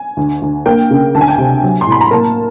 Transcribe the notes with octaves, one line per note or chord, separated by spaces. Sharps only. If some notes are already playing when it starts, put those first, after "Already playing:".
Already playing: G#5
D2
D2
A#3 G5
C#3
D2 A5
G#5
G5
C3 G#5
F#3
C6
A2
B5
A#5
A#3 A5